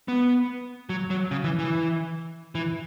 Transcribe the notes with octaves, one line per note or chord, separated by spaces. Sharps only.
B3
F#3
F#3
C#3
E3
E3
E3